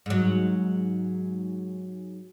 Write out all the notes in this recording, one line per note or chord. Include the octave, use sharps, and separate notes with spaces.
G#2 F#3